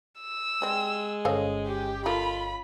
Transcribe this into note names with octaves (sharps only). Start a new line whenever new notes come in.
E6
G3 G#3 C4
G1 C#4 A4 C5 D#5 F5
G4
A3 F4 A#4 B5